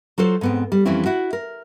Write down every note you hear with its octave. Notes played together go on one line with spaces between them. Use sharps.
F#3 F4 A4 C5
G#2 B3 C4
G3
F2 E3 G3 C4 C#4 E4
E4 F#4
A#4